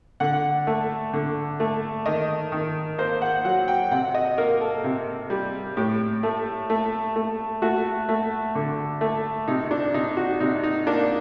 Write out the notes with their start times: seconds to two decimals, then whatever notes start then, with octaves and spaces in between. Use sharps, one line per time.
0.20 D3 F#5
0.67 A3
1.14 D3
1.60 A3
2.06 D#3 D#5
2.52 D#3
2.98 A#3 C5
3.22 F#5
3.45 F#3 F#5
3.68 G5
3.91 C3 F#5
4.15 D#5
4.38 A#3 A#4
4.61 A4
4.84 C3
5.30 G3
5.77 A2 G4
6.23 A3
6.70 A3
7.16 A3
7.62 A3 F#4
8.09 A3
8.55 D3
9.01 A3
9.48 C3 D#4
9.71 D4
9.94 C3 D#4
10.17 F#4
10.40 C3 D#4
10.64 D#4
10.87 A#3 D4